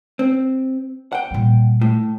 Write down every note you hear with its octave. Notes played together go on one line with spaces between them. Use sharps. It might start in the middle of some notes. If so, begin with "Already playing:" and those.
C4
F#5 G5
A#2 G3
A2